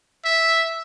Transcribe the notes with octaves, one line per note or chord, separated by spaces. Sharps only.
E5